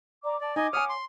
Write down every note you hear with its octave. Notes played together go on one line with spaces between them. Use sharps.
D5 A#5 D6
D5 A5
D#4 D#5 G#5 D6
C#5 F#5 G#5 D#6 F6
C6